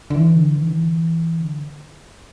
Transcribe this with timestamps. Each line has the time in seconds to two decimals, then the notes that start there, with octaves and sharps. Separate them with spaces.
0.10 D3
0.15 E3
0.36 D3
0.57 E3
0.65 D3
0.72 E3
1.40 D3